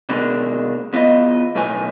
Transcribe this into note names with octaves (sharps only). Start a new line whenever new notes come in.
B2 D3 D#3 G#3 A#3 D4
E2 B3 F4 A4 D#5
B1 A2 D#3 B4 G#5